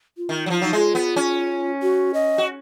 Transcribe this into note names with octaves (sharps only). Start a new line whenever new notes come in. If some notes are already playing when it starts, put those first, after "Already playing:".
F4
D#3
F#3
F3 F4
F#3 D#4
G#3 F4
B3
C#4
F#4
D#5
F#4